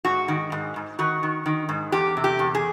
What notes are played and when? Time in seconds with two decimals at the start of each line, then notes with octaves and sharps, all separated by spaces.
0.05 G#2 F#4
0.28 D#3
0.52 G#2
0.76 G#2
0.99 D#3 F#4
1.23 D#3
1.46 D#3
1.69 G#2
1.92 E2 G4
2.17 C3
2.24 G4
2.39 E2
2.55 G#4